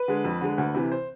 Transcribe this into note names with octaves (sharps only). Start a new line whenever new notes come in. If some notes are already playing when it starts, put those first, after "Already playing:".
Already playing: B4
D3 G#3
F2
D3 G#3
D2
C3 E3
C5